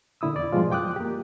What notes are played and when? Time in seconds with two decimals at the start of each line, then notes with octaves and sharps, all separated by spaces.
0.21 A#2 D3 E4 D#6 E6
0.35 E2 D5
0.52 G#2 B2 F3 G3 G#3 F4
0.71 F#2 G5 D6 D#6 F#6
0.96 A#3 G4